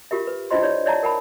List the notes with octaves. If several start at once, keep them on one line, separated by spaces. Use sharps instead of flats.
F4 G4 A#4 E5
B4
D4 E4 F4 C5 D#5 C6
E4 G4 C#5 D5
C#5 D5 E5 F5 A5 A#5
A#4 F#5 A5 B5